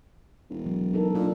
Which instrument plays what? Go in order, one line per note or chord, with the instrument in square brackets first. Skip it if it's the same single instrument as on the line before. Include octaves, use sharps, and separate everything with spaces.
[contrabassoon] E1
[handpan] F#3
D#4 A4 A#4
[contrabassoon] A#2 [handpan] D4